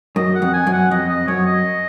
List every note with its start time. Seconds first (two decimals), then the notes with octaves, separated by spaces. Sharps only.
0.16 F#2 D#5
0.35 F#5
0.42 F2
0.53 G#5
0.67 F#2
0.73 F#5
0.91 F2 D#5
1.09 D#5
1.28 F#2 C#5
1.46 D#5